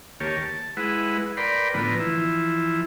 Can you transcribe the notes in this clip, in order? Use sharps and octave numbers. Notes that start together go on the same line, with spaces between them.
D#2 A#3 G4 C#5 A5
A5
G#3 E4 B4 F#5
A#4 B4 D5 G5 B5 C6
A2 D3 F3 B3 B4 A#5
E3 F3 E4